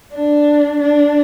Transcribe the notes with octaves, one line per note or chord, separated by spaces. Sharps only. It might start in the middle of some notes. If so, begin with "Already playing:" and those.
D4
D4